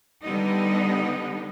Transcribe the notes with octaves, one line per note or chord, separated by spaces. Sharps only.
D3 G3 B3 D#4